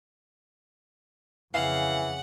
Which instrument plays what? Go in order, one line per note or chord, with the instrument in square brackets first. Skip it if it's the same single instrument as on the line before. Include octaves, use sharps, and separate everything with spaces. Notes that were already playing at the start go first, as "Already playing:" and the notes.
[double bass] F2 C#3 [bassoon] E3 [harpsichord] F5 [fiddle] F#5